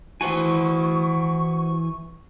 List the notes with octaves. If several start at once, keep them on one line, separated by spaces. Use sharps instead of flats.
E3 F#4 C5 G#5 C#6